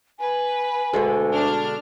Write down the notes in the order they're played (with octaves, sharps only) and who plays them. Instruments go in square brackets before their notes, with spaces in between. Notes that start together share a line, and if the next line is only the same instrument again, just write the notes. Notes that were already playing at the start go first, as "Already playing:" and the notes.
[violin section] B4 [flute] G#5
[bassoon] D2 [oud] B2 D3 G#3
[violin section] D4 F6